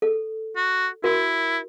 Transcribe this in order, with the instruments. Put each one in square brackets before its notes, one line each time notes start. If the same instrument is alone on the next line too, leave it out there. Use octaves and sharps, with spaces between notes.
[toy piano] A4
[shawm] F#4
[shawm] E4 [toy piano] F#4 A#4